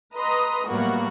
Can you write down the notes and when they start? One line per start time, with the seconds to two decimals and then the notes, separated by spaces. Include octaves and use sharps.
0.16 B4 D#5 A#5 C6 D#6
0.69 A2 F#3 G3 A#3 B3 F#4